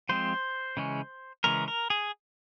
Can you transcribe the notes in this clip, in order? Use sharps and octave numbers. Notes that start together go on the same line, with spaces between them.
F3 G#3 C4 C5
C#3 E3 G#3 C#4
C#3 E3 G#3 C#4 A#4
A#4
G#4